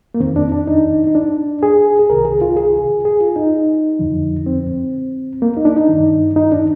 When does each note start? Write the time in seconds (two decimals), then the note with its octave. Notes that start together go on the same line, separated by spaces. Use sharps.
0.15 A#3
0.20 F2 D#3 C4
0.36 D4
0.52 D4
0.67 D#4
1.07 D#4
1.15 D4
1.63 G#4
1.99 G#4
2.10 C2 C3 D#3 A#4
2.25 G#4
2.41 F4
2.57 G#4
3.05 G#4
3.20 F4
3.36 D#4
3.99 F2 D3 F3
4.46 C4
5.42 A#3
5.57 D#4
5.65 D4
5.76 D#4
5.89 G2 D#3
6.36 D#4
6.52 D4